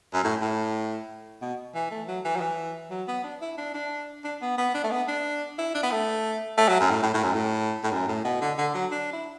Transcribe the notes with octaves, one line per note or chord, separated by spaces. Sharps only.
F#2
A2
A2
B2
E3
A3
F#3
E3
F#3
E3
F#3
B3
D4
E4
D4
D4
D4
B3
B3
D4
A3
B3
D4
E4
D4
B3
A3
A3
F#3
F#2
A2
A2
A2
F#2
A2
A2
F#2
A2
B2
D3
D3
F#3
D4
E4